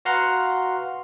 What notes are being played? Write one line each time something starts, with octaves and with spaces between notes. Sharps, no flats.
F#4 B4 F5 F#5 A#5 C6